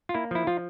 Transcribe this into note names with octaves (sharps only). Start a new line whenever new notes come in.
F4
A#3 E4
F3 E4
F3 F4